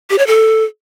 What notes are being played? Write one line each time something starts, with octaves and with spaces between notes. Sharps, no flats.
G4
C#5
A4